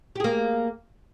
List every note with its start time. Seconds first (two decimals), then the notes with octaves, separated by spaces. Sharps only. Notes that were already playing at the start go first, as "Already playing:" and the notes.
0.15 G4
0.20 G#4
0.24 A#3